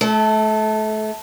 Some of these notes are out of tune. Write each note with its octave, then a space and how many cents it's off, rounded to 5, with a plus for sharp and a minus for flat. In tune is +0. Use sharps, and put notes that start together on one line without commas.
A3 -30 A4 +5